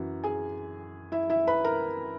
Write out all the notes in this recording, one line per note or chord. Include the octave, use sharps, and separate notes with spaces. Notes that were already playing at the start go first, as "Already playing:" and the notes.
Already playing: F#2 E3 F#4
G#4 G#5
E4 E5
E4 E5
B4 B5
A#4 A#5